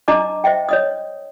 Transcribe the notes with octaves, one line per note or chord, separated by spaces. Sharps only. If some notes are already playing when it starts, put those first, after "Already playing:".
D4 D#5 A5 A#5 D6
C5 D#5 E5 G5
C#5 D#5 D#6